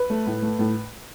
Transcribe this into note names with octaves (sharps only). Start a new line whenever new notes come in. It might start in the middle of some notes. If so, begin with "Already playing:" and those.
Already playing: B4
A3
A2
A3
A2